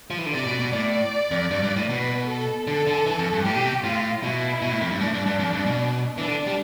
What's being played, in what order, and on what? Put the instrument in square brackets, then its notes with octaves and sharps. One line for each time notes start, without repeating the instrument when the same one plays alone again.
[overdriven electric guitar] F3
E3
D3
[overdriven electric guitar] C3 [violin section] D5
[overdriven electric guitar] B2
B2
[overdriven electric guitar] A2 [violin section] D5
[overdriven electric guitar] F2
G2
G2
A2
[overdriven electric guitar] B2 [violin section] B4
[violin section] A4
[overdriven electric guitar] D3 [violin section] A4
[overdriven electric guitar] D3
E3
F2
G2
[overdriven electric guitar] A2 [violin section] G4
[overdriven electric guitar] B2
C3
[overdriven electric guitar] A2 [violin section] F4
[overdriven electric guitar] B2 [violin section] E4
[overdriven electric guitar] B2
A2
F2
G2
[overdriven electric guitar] A2 [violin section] D4
[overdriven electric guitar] G2
G2
F2
G2
B2
[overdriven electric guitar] E3 [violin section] D4
[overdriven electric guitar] D3
G3